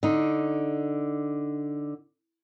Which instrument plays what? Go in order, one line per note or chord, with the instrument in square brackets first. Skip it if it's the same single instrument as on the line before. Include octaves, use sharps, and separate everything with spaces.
[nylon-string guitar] D3 D#4